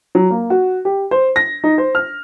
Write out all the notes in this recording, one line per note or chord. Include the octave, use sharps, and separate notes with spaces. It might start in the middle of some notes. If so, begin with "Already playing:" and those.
F#3
A#3
F#4
G4
C5
A#6
D#4
C5
F6